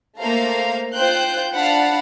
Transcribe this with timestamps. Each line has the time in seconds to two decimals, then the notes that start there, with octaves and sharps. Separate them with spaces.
0.19 A3 A#3 C5 F5 A#5
0.95 F4 C5 G5 F#6 G6
1.54 D4 F5 F#5 A5 B5